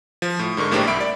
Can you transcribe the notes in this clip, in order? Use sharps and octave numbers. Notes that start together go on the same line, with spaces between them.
F3
A2
G#2 D3 A#4 C#6
A#1 A2 A#3 D4 G4 C5
C2 E5 B5 D7
D5